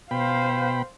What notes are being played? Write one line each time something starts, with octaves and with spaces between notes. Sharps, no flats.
B2 C5 F5 G5 B5